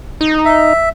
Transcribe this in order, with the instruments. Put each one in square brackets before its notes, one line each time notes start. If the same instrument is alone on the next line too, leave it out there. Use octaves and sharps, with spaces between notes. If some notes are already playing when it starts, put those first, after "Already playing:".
[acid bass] D#4
[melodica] E5